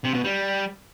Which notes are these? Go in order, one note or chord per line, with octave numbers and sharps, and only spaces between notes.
C3
B2
G3